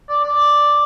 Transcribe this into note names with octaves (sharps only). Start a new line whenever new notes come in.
D5
D5